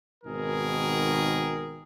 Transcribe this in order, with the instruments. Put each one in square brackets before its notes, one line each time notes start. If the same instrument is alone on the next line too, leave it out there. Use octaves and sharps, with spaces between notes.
[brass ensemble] G#1 B2 D#3 G#4 A#4